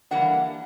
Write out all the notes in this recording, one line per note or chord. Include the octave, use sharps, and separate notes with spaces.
E3 G3 A#3 D4 F#5